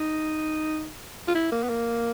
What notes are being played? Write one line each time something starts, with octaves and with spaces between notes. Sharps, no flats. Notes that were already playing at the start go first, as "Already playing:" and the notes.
Already playing: D#4
F4
E4
A#3
B3
A#3